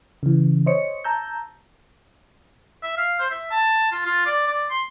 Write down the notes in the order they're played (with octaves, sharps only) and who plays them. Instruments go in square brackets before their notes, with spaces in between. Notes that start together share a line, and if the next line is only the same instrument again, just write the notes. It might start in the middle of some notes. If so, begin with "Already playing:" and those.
[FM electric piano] C#3 E3
C5 C#5 D#5 C#7
A5 A#5 E6 G6
[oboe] E5
F5
C5
E5
A5
F4
F4
D5
D5
C6